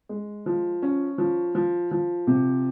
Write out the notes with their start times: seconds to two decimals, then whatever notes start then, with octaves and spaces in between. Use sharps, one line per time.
0.09 G#3
0.46 F3
0.82 C#4
1.18 F3
1.55 F3
1.91 F3
2.27 C3